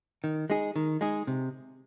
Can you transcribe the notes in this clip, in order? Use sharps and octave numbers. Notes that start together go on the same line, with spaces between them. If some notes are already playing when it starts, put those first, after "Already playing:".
D#3
G#3 D#4 G#4
D#3
G#3 D#4 G#4
C3